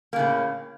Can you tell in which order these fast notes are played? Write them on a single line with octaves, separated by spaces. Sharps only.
A#3 C#3 A2